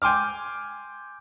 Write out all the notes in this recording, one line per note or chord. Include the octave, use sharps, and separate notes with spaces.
G5 G#5 C6 D6 F6